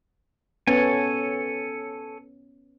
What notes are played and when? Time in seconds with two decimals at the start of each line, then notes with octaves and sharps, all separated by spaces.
0.67 B3 C#4 A4 C#5 G#5